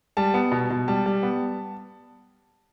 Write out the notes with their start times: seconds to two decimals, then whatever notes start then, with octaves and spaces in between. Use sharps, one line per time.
0.17 G3 A5
0.34 B3
0.52 B2
0.70 B2
0.88 G3 A5
1.06 G3
1.23 B3